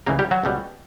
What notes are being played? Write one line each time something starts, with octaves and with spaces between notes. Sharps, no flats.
C#2 C#3 E3 A#3 A#4
G3 G4
F#3 F#4
C#2 B2 G3